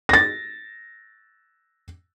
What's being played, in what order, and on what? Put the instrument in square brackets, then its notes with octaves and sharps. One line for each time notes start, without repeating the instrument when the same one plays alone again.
[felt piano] A6 A#6